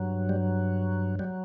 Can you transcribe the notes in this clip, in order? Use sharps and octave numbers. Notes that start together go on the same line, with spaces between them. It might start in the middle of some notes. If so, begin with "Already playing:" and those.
Already playing: G2 F#3
G3
F#3 G3